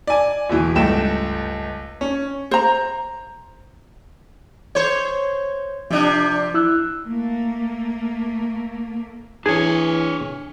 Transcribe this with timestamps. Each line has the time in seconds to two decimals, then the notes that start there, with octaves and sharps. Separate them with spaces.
0.07 D5 G#5
0.49 E1 B2 E3
0.75 C#2 G2 A3 G5 E7
2.01 C#4
2.51 C5 A#5
4.75 C5 C#5
5.91 C3 F3 D4
6.54 E4 E6 F#6
7.05 A3 A#3
9.46 E3 D4 G#4 C#5